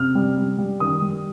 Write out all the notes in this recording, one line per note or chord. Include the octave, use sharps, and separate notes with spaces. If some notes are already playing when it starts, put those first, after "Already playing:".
Already playing: C3 F6
G3
G3
G3
D#3 D#6
G3